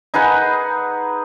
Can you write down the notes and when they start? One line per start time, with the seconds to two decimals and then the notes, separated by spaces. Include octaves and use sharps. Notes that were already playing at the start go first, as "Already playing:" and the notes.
0.14 D#4 G#4 B4 F#5